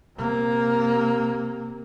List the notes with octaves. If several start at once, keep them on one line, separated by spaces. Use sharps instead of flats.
C3 A#3